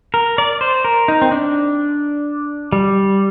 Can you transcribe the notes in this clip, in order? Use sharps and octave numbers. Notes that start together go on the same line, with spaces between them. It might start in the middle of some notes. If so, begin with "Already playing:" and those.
A#4
D5
C5
A#4
D#4
C4
D4
G3